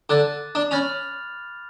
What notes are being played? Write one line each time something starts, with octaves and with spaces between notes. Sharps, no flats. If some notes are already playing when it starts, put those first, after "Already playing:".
D3 D6 F#6 A6
D4
C#4 B5 F6 A6 F7